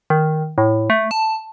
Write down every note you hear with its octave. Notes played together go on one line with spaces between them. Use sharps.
D#3
A2
A3
A5